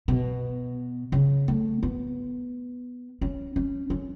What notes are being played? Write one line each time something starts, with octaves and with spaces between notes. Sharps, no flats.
B2
C#3
A3
B3
C#4
C#4
C#4